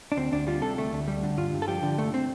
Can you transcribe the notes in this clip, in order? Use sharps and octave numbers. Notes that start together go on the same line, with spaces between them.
D4
D2 C4
D2 D4
G3 F4
C3 A4
D2 A3
D2
G3
D3
G2 F4
G2
A4
F3 G4
D3
C2 A3
C4